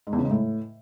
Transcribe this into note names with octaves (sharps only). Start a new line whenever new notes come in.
G#2
E2
C#3
G#2
A2